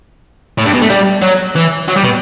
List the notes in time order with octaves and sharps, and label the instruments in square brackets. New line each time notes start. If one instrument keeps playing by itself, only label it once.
[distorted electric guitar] A2
G2
B2
A3
G3
F#3
E3
F#3
G3
B2